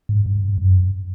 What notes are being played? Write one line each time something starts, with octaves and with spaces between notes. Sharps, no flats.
G#2
G2
F#2